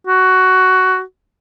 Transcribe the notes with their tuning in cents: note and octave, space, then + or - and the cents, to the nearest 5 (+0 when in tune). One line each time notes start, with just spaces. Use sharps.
F#4 +10